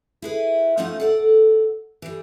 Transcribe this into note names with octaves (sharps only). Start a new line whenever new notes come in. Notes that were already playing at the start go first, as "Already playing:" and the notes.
E4 G#4 B4
F3 A3 C#4 D#4 F4 F#5
A4 D5 F#5
E3 G3